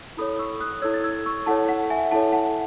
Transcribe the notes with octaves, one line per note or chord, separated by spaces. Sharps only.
E4 A4 C#5 B5 D#6
C#6 E6
D#6 F#6
E4 A4 C#5 E6 G#6
A6
E6 G#6
C#6 E6
E4 A4 C#5 F#5 A5
F#5
E5 G#5
E4 A4 C#5 F#5 A5
F#5 A5